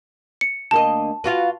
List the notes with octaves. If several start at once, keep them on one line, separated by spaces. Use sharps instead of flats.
C#7
D2 A#3 D#5 A5
F4 F#4 B4